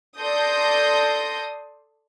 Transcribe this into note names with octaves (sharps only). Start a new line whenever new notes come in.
A4 D5 C6 D#6 G6 A#6